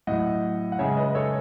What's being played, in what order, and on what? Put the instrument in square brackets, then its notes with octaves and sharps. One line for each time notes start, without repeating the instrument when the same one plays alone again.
[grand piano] A2 F#3 D#5 F#5
F#5
C#3 C#5 E5
G#3
B4 D#5
A4 C#5